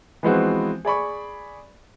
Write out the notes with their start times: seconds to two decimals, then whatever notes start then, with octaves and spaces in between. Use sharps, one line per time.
0.23 E3 F3 G#3 B3 C4 F#4
0.85 G#4 D5 B5 C#6